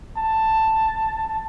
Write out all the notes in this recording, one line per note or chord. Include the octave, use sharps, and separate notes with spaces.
A5